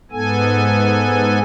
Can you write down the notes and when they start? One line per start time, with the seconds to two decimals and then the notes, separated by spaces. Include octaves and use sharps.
0.12 G#2 B3 A4 G#5